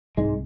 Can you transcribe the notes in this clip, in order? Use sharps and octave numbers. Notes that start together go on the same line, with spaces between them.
C2 G#2 G#3